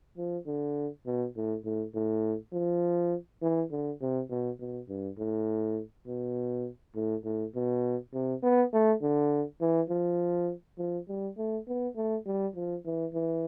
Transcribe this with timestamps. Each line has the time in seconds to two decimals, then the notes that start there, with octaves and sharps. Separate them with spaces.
0.17 F3
0.47 D3
1.06 B2
1.36 A2
1.65 A2
1.94 A2
2.53 F3
3.42 E3
3.71 D3
4.01 C3
4.30 B2
4.60 B2
4.89 G2
5.18 A2
6.07 B2
6.95 A2
7.24 A2
7.55 B2
8.14 C3
8.43 B3
8.73 A3
9.02 D3
9.61 E3
9.90 F3
10.78 F3
11.09 G3
11.37 A3
11.68 B3
11.96 A3
12.26 G3
12.55 F3
12.85 E3
13.14 E3